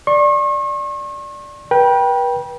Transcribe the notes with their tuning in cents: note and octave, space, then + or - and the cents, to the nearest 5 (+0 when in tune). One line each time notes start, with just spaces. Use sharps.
D5 +0 C#6 -40
B4 -35 G5 +0